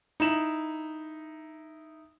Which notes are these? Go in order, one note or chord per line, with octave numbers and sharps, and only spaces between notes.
D#4 E4 E7 F#7